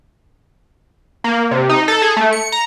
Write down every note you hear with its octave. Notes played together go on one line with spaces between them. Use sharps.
A#3
C3
D#4
A4
G#4
A3
C#7
A#5